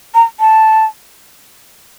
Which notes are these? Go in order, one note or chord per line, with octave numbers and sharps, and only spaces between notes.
A#5
A5